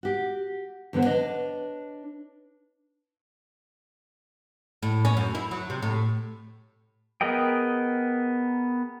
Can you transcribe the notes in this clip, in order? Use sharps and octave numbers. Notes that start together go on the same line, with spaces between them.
F#4 G4
E2 D3 B3 B4 C5
D4 B4 C#5 D#5
A2
C#4
F#2
E4
F#3
C3
A2
B3 G#4 A#4 D#5 G5